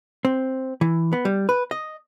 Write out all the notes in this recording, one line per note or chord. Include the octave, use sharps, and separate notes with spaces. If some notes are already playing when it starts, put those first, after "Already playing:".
C4
E3
B3
G3
B4
D#5